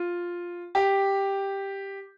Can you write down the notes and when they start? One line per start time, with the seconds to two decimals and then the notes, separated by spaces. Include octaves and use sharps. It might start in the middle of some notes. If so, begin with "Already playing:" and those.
Already playing: F4
0.75 G4